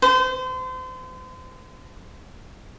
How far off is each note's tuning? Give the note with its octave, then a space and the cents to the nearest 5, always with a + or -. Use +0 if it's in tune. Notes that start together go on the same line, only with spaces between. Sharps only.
C5 -35